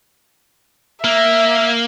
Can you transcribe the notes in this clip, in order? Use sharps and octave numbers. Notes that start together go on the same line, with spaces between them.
A#3 E5